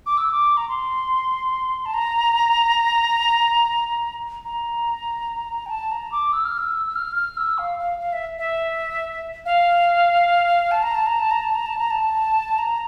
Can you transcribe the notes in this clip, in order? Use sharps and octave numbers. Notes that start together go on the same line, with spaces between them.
D6
E6
D6
A#5
C6
A5
A#5
A#5
G5
A5
A#5
D6
E6
F6
E6
E6
F6
F6
E6
F5
F5
F5
E5
E5
F5
A5
A#5
A5
A#5
A5
A#5
A5
A#5
A5
A#5
A5
A#5